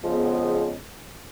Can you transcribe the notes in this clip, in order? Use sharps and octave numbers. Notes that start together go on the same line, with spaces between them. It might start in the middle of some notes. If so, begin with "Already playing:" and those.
F2 C#3 F3 G#3 B3